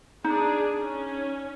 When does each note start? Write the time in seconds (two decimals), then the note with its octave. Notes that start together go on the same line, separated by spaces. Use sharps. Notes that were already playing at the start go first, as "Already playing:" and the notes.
0.24 D4 D#4 G#4
0.80 C#4